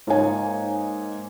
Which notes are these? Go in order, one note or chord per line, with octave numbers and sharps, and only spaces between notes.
G#2 A#3 D#4 C#5 G#5